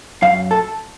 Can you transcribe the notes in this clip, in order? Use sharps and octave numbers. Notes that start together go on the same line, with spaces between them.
F#2 F5
A4